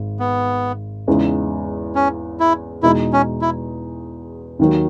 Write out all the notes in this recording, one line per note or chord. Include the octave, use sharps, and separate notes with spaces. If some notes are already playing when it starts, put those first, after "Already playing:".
Already playing: G#1
B3
E2 C#3 G#3 D#4
C#4
E4
E2 B2 G#3 D#4 E4
C#4
E4
D#2 D#3 F#3